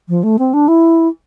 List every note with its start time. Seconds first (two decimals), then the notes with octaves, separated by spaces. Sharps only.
0.09 F3
0.23 A3
0.39 C4
0.54 D4
0.68 E4